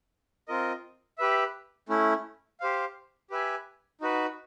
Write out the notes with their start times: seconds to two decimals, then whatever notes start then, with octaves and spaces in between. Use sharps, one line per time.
0.48 C4 F4 A#4 D#5
1.18 G4 B4 E5
1.89 A3 C#4 E4
2.60 G4 C5 F5
3.30 G4 B4 E5 G#5
4.01 D#4 F#4 B4